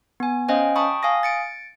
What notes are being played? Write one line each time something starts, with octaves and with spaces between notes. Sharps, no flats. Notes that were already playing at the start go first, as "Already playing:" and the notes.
B3 G#5
C#4 C5 D#5 F5 G5 G#5
G5 A5 B5 C#6 D#6
F5 G#5 D#6 A#6
A6 C#7 D7